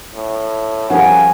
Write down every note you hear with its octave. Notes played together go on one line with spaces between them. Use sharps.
A2
C#3 F3 G3 A#4 F#5 G#5